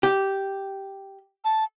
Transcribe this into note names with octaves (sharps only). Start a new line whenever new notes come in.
G4
A5